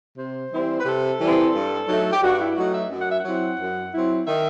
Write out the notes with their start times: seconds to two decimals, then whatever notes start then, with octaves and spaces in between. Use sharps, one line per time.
0.18 C3 C5
0.52 E3 G3 C4 E4
0.80 B4
0.85 C3 A4
1.20 E3 G3 C4 E4
1.54 G2
1.88 F#3 A3 D#4
2.13 G4
2.22 G2 F#4
2.39 E4
2.56 F#3 A3 D#4 F#4
2.73 E5
2.91 F#2
3.00 F#5
3.10 E5
3.19 F#5
3.25 F#3 C4 E4
3.59 F#2
3.93 F#3 C4 E4
4.27 D#3 E5